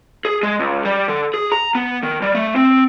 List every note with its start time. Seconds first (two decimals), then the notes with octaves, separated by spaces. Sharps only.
0.25 G#4
0.43 G#3
0.60 C#2
0.85 G3
1.08 D3
1.34 G#4
1.52 A#5
1.75 B3
2.03 D#3
2.22 G3
2.35 A3
2.56 C4